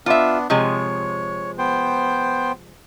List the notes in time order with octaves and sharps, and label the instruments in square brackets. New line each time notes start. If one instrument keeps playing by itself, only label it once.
[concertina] B3 D4 [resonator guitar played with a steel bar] F4 E5
[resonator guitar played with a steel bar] C3 F3 G#3 [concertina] C#5
[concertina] B3 C5 G5